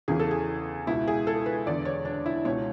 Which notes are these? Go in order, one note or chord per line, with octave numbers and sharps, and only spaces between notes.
E2 C#3 E3 G#4
A4
G#4
C#2 B2 E4
G#4
A4
B4
E2 D3 D5
C#5
D4
E4
C#2 B2 C#5